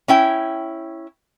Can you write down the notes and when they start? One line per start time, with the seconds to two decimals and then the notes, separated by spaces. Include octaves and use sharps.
0.08 C#4 E4 G5